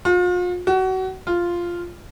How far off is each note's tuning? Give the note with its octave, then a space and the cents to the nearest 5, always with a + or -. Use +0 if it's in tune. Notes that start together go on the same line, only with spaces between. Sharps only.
F4 +40
F#4 +25
F4 -5